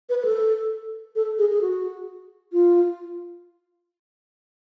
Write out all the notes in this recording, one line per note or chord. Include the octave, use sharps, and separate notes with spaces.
B4
B4
A4
A4
G#4
G#4
F#4
F4